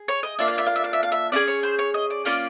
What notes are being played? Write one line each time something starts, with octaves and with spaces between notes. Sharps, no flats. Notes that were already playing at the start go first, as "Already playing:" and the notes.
Already playing: G#4
C#5
D#5
A#3 D4 F4 E5
F5
E5
F5
E5
F5
E5
F5
E5
C#4 F4 G#4 D5
C#5
C5
C#5
D#5
D5
A#3 C#4 F4 D5